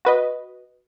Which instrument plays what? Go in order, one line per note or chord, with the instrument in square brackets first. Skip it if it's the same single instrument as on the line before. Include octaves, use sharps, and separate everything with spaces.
[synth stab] F#4 B4 D#5